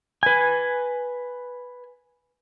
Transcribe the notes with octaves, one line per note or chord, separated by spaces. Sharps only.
B4 G#5